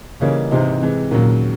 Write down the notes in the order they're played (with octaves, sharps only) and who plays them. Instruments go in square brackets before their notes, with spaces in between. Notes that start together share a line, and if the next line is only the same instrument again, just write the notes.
[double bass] C#3 [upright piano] E3 G3 A#3 D#4
[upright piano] G#2 E3 G#3 C4 D#4 [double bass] C3
[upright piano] C3 E3 G#3
[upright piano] D#2 C#3 F#3 [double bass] A#2